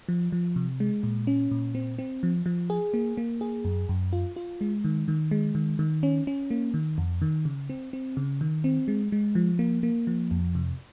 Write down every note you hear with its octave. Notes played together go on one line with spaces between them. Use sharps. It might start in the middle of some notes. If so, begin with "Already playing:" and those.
F3
F3
C3
G#3
A#2
C#4
A#2
C4
C4
F3
F3
G#4
A#3
A#3
G#4
F#2
F#2
F4
F4
G#3
D#3
D#3
G#3
D#3
D#3
C#4
C#4
A#3
D#3
F2
D#3
C#3
C4
C4
C#3
D#3
C4
G#3
G#3
F3
A#3
A#3
F3
F2
C3